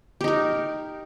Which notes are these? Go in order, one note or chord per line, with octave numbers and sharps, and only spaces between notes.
D#4 G4 A#4